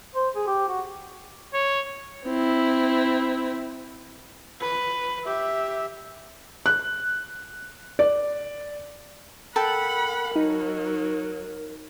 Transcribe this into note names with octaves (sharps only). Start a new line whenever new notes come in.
C5
G#4
G4
F#4
C#5
C4 E4
B4
G4 E5
F#6
D5
A4 A#4 F#5 G5 A5 B5
F#3 D#4